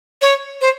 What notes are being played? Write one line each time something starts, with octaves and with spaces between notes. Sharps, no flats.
C#5
C5